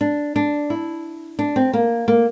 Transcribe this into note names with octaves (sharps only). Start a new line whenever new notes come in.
D4
D4
E4
D4
C4
A#3
A#3